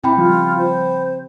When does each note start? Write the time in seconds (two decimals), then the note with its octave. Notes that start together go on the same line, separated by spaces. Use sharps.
0.04 A#2 C4 E4 G5 B5
0.17 C#3 F3 G3 F4
0.58 C5